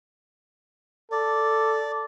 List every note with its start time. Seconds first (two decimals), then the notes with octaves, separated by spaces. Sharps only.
1.12 A4 D5